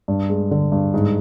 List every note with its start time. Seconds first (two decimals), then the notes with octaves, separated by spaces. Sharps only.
0.08 G2
0.29 G#3
0.51 D3
0.72 G2
0.94 G#2